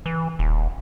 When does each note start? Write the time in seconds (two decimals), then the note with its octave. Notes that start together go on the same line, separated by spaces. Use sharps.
0.06 E3
0.39 D#1